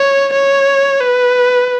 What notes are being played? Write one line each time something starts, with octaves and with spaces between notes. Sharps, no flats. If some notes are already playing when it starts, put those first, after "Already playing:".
Already playing: C#5
C#5
B4